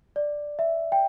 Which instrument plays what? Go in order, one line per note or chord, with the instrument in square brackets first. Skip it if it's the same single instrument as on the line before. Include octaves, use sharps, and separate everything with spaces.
[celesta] D5
E5
G5